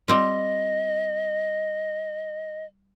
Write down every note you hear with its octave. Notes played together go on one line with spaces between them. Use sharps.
G3 C4 F4 D#5